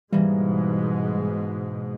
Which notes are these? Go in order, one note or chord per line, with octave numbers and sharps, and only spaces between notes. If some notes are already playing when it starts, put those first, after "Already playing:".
G#2 B2 E3 G3 G#3 A#3